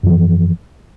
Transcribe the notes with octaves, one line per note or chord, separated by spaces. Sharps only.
F#2 E3 F3